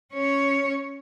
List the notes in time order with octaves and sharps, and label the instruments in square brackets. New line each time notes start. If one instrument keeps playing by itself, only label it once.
[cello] C#4 C#5